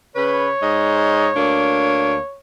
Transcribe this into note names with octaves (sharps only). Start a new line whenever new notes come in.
C#3 B4 C#5
G#2 D#5
D2 A#3 D4